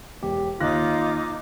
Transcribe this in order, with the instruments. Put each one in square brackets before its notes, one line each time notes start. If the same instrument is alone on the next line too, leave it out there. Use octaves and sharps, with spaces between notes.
[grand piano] E1 G4
[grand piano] D#2 F#6 A#6 [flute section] D#4 F4 D6